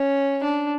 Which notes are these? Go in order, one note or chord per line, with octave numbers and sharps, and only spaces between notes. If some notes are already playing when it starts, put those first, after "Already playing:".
Already playing: C#4
D4